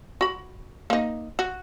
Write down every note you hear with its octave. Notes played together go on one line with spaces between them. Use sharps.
F#4 B5
A#3 D#4
F#4